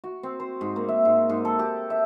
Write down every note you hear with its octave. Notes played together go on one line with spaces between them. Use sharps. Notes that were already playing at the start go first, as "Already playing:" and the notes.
F#4
C4
C5
G#2
A#3
E5
G#2
G#2
A4
G4
E5